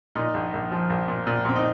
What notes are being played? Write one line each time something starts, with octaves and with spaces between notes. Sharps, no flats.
A#2 D#4
A#1
A#1
F3
A#1
A#2
A#2
A#2 C4
D#4